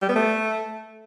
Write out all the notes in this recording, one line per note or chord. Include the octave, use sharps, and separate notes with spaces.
G3
B3
A3